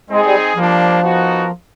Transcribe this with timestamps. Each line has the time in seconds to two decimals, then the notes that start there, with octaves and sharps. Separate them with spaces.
0.10 G#3 C4 D#4 G#4
0.25 G3
0.55 F3 G3 A#3 D4
1.01 B3 D#4 F#4 A#4